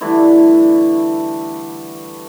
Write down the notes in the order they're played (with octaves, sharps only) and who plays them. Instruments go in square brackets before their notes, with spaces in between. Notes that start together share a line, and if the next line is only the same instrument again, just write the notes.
[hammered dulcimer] D3 E3 G3 A3